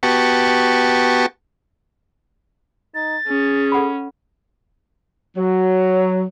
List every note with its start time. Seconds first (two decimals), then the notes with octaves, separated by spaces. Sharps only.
0.03 B3 F#4 G4 A5 C#6
2.95 D#4 A6
3.28 C#4 G#4
3.72 A4 F#5 B5
5.37 F#3